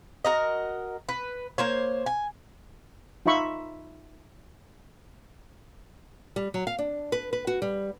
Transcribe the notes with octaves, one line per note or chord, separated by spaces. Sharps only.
F#4 A#4 D#5
B4
A#3 C5 C#5
G#5
D#4 F4 E5 B5 C#6
G3
F#3
F5
D4
B4
B4
F#4
G3